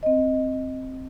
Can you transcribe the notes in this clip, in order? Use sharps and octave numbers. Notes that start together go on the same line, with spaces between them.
C4 D#5